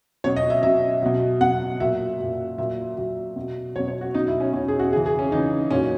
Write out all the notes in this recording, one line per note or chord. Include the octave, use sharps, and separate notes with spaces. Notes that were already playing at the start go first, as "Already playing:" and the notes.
B2 F#3 C#5
D#5
E5
B2 F#3 E5
B2 F#3
B2 F#3 F#5
A#2 F#3 E5
A#2 F#3
A#2 F#3 E5
A#2 F#3
B2 F#3
B2 F#3 C#5
C#5
F#4
B2 F#3 D#4
E4
C#4
B2 F#3 C#4
G#4
F#4
C#3 E3 G#4
G#4
C#4
C#3 E3 D#4
A#2 F#3 C#4